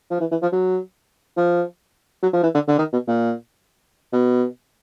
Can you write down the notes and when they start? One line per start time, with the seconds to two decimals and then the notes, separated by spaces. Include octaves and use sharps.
0.11 F3
0.20 E3
0.31 E3
0.42 F3
0.52 F#3
1.37 F3
2.23 F#3
2.33 F3
2.43 E3
2.54 D3
2.68 D3
2.78 D#3
2.92 B2
3.07 A#2
4.13 B2